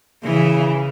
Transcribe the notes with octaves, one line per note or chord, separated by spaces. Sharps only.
C#3 E3